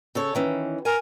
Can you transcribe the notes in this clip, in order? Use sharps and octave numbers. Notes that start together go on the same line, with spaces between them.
C#3 A4 C#5
D#3 E3 C#4
A#4 G#5